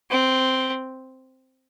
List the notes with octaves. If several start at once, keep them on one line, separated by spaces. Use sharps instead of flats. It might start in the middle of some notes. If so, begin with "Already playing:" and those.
C4